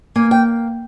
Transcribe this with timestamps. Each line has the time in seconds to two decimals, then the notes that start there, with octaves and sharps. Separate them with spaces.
0.16 A#3 G#5
0.31 G5